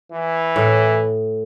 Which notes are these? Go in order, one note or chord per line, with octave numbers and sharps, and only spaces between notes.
E3
A2